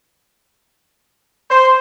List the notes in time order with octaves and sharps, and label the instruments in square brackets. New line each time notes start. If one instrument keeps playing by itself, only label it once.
[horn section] C5